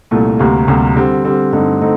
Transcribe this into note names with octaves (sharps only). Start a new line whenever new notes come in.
C2 A#2 A3
D2 C3 G3 A#3
D2 C3 G3 A#3
D3 G3 C4
D3 G3 C4
G2 D3 A3 C4 D#4
D3 A3 C4 D#4